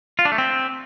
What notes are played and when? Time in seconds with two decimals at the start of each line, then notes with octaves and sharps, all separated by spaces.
0.19 F4
0.25 D4
0.32 A3
0.38 C4